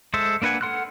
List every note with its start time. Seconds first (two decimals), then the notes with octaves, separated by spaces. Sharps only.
0.14 G#3 A4 C5 E5
0.42 A#3 D4 B4 F#5 G#5
0.61 A4 F#5 C6 F6 F#6